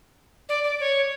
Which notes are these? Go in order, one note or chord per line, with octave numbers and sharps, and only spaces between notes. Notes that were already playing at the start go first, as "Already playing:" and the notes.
D5
D5
C#5